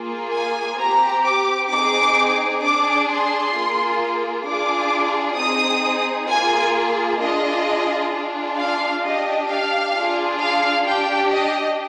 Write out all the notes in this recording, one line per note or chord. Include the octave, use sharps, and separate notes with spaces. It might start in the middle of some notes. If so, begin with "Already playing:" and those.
Already playing: A#3 F4 G#4
G#5
C4 G4 A#5
D6
C4 D#4 G#4 D6
D4 G#4 D6
C6
A#3 F4 G#4
D4 F4 G#4 D6
C4 D#4 G#4 D#6
A#3 F4 G#4 G#5
D4 F4 G#4 D#5
D4 F4 G#4
F5
D4 G4 D#5
F5
D4 F4 G#4
F5
D4 G4 G5
D#5